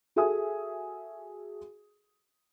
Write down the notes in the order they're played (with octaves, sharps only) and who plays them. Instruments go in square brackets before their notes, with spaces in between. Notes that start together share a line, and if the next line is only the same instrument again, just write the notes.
[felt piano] F#4 G#4 A4 E5 G#5 D#6